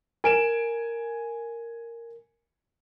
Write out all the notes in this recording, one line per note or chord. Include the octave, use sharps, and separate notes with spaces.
A#4 G#5 D7 E7